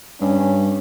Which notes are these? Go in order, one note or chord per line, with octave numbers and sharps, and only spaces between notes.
G2 C#4